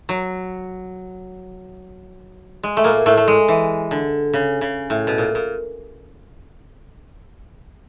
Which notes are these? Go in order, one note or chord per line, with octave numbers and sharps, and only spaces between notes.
F#3
G#3
A3
A#2 A#3
A2 A3
A3
G#3
E3
D3
C#3
C#3
A2
B2
A#2
A#2